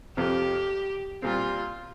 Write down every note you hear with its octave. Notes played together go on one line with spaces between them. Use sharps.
F2 C3 F3 G4
A#2 G3 C4 F4